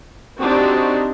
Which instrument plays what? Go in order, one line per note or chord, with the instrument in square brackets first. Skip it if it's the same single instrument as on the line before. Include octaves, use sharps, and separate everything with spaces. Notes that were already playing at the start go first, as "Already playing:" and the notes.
[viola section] F#3 C4 D4 D#4 F#4 G4